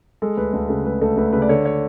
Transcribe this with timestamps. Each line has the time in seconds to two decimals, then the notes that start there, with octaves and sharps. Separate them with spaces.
0.22 G#3 A4
0.37 D2 B4
0.53 D2
0.69 C#3 A4
0.85 G#3 B4
1.01 D2 A4
1.17 D2 B4
1.33 C#3 B4
1.42 D5
1.49 D3 C#5
1.65 C#5